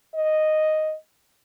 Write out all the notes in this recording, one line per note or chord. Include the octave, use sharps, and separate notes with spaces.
D#5